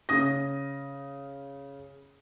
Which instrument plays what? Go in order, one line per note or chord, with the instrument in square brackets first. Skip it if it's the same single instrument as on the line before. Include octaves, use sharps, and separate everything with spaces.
[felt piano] C#3 D#6 A#6